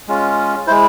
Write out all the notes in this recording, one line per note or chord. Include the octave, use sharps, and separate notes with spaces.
G#3 C#4 F4
G#3 E4 C5